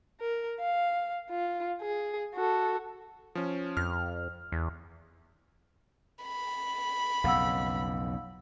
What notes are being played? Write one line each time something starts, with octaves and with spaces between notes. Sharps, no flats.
A#4
F5
F4
G#4
F#4 A4
F3 C#4
F2 F6
E2
B5
B1 F2 C#3 F5 F#5 E6